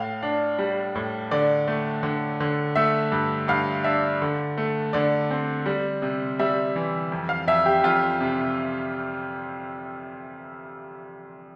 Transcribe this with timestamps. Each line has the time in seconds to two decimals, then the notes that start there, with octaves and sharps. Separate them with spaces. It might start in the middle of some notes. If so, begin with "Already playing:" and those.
Already playing: A2 F5
0.23 D4
0.59 G3
0.95 A2
1.31 D3 D5
1.68 A3
2.03 D3
2.40 D3
2.76 A3 E5
3.12 G2
3.48 G2 F5
3.84 D4 E5
4.22 D3
4.58 A3
4.93 D3 D5
5.31 C4
5.66 G3
6.02 C3
6.39 G3 E5
6.76 E3
7.12 F2
7.29 F5
7.48 F2 E5
7.66 G4
7.84 F2 F4
8.21 C3